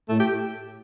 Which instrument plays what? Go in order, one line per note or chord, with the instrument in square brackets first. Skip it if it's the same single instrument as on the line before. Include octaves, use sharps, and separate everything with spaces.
[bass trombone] A2 [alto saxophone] A3
[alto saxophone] G4